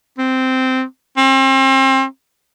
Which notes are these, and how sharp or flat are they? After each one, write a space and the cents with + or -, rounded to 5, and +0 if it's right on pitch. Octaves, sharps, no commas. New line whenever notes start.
C4 -10
C4 +35